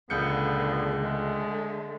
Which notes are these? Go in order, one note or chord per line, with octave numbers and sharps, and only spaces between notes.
C#2 A#2 D3 B3 G#4 G6 C#7
D3 G#3 A3